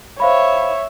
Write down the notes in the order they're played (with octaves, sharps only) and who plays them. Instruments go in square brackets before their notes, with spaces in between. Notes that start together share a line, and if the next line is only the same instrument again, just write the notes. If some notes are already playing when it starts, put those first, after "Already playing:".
[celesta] C5 F5 B5 [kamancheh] C#5 E5